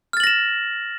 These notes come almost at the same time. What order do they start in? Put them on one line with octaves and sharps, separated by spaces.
F6 A6 F#7 A#6 E7